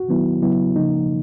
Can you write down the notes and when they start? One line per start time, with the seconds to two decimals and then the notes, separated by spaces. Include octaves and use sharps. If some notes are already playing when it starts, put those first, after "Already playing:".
Already playing: F#4
0.09 D#3 F#3 B3 E4
0.42 C#3 F#3 B3 E4
0.76 C#3 F3 A#3 D#4